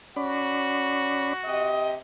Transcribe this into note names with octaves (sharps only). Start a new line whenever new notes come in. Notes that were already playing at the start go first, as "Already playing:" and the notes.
C#4 F#4 D5 B5
C3 G4 D#5